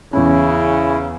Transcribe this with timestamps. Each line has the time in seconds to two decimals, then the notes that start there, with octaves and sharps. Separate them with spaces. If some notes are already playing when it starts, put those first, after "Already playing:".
0.13 E2 C#3 C#4 E4